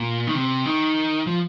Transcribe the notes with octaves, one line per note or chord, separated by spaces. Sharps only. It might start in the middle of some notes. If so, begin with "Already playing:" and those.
Already playing: A#2
D#3
C3
D#3
F3